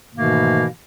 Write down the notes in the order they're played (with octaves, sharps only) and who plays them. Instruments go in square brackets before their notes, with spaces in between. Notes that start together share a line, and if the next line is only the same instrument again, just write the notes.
[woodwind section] G#2 B2 D#3 E3 A3 A#3